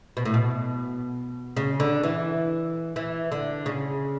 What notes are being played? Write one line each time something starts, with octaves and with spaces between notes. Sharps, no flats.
B2
A2
B2
C#3
D3
E3
E3
D3
C#3